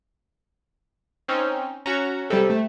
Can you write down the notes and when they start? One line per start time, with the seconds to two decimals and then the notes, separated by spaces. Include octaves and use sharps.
1.28 C4 C#4 D#4
1.86 C#4 F#4 A#5
2.30 C3 G3 A4
2.50 A3